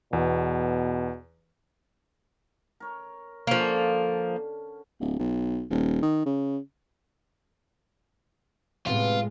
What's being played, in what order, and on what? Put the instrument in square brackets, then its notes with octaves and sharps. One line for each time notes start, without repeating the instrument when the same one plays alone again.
[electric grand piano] E2 [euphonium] B2
[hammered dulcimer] A#4 C#5
[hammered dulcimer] D3 C#4 [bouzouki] F3 A#3
[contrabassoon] D1
B1
D#1
D#3
C#3
[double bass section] A2 G#3 [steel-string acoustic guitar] C3 B3 [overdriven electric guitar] F4